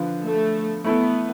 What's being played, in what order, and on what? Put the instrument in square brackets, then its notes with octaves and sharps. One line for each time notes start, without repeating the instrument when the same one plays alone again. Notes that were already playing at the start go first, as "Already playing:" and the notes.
Already playing: [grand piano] D3 F3 B3 F4
[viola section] A3
[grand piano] A3 E4 A4 [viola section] B3